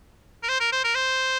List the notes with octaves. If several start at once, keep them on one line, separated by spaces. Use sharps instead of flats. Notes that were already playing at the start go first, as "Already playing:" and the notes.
A#4
C5
A#4
C5
A#4
C5